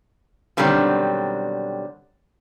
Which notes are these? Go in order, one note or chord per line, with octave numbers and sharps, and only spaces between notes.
B2 D3 D#3 F#3 G3 C4